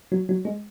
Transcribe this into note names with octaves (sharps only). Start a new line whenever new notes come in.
F#3
F#3
G#3